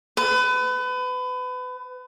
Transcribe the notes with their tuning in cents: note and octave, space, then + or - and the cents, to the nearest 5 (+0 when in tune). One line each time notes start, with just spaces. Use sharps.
B4 +30